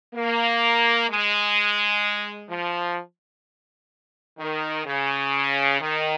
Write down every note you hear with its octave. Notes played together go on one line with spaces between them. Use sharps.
A#3
G#3
F3
D#3
C#3
D#3